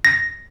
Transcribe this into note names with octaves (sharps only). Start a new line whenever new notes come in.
A#6